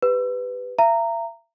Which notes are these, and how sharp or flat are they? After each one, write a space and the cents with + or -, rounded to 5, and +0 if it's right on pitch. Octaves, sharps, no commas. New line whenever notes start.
G4 +10 B4 +10
E5 +40 A#5 -15